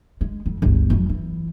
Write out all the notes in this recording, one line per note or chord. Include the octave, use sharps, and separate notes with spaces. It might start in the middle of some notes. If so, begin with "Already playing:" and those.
G#3
F2
G1 C#2
F2 F#3
E3